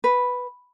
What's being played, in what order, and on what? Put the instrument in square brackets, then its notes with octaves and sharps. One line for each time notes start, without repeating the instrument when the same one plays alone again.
[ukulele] B4